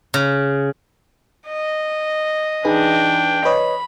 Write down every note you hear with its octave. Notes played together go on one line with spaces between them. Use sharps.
C#3
D#5
E3 D4 D#4 G#4 B4 G5
B4 C#5 D#5 B5